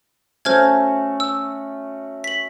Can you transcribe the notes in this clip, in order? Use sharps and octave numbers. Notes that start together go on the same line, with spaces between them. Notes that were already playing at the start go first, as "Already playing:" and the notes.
A3 C#4 F#4 C5 F6 G#6
E6
B6 F#7